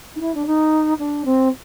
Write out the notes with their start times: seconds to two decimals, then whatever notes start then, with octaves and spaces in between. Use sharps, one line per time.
0.16 D#4
0.20 E4
0.35 D4
0.46 D#4
0.99 D4
1.25 C4